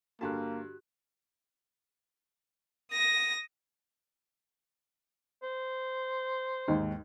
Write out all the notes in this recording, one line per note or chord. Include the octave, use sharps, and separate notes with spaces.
G2 D3 A#3 F#4 G4 A5 F#6
D#6 A#6
C5
D#2 G#2 D#3